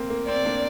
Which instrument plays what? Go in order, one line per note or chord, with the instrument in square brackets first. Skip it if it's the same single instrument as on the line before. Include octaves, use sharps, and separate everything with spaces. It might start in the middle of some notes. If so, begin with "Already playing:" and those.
Already playing: [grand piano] A#3 C4
A#3
[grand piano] C4 [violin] D5
[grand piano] A#3 D4